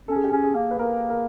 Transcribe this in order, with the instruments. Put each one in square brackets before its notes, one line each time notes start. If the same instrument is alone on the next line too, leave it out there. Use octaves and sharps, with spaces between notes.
[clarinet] C#4 [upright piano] A4
[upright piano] G#4
G4
[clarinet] C#4 [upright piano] G#4
[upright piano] G#4
[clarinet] A#3
[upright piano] B4
[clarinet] A#3 [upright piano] A#4
[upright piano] A#4